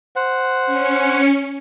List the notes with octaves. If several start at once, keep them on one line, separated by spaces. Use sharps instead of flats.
C5 F#5
C#4 C#7